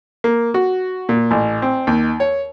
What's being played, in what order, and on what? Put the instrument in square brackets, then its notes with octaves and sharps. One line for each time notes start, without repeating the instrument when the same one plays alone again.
[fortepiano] A#3
F#4
A#2
A1
C4
D#2
C#5